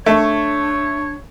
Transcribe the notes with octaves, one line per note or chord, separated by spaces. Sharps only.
A3 D4 C#5